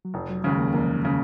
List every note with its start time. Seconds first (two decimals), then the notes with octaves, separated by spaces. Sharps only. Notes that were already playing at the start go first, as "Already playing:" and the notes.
0.05 F#3
0.14 F1 F3
0.30 F#3
0.44 D#2 C#3 G#3
0.58 A#3
0.74 F1 A#3
1.05 C#3